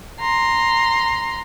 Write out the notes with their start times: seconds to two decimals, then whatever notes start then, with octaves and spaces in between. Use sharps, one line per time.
0.20 A#5 C6